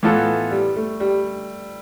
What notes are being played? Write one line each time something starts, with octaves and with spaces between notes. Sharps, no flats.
A2 E3 B3 F4 A4
G3
A3
G3